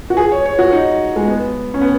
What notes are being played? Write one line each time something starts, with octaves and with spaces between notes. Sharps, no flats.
F#4
G#4
C#5
C#5
F#4
D#4
G#3
B3
C#4
B3